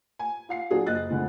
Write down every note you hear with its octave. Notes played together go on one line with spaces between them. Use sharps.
G#5
F4 F5 C7
A#2 F#3 D4 F#4 G#4
F#1 D#5 F#6 A6
F2 A2 D3 G#3